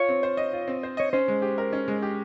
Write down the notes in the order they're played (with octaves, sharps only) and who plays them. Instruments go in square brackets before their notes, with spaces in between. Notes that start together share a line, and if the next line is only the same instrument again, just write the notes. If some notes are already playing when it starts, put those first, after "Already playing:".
Already playing: [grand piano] F4 [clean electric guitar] C#5
[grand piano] C4
C5
D#5
F4
C4
C5
[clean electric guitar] C#5 [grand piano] D#5
[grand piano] C#4 [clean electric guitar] C5
[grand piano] G#3
G4
A#4
C#4
G#3
G4